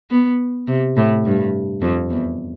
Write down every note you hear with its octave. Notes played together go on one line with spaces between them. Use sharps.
B3
C3
A2
G2
F2
E2